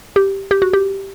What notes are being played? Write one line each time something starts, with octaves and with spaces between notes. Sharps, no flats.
G4
G4
F#4
G4